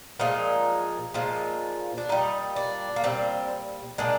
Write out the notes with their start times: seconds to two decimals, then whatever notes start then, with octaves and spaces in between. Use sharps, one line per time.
0.19 A#2 F3 G#3 D#4
1.14 A#2 F3 G#3
1.98 D4
2.09 A#2 G3 D#4
2.56 D4
2.96 A#3
3.04 A#2 G3 C4
3.98 A#2 G#3 D4